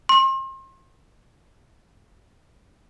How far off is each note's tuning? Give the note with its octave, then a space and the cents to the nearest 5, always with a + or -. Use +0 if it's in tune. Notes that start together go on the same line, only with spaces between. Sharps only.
C6 +35